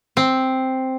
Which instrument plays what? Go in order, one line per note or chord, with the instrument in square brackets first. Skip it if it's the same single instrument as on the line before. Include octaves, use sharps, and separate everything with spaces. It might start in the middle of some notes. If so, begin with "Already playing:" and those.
[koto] C4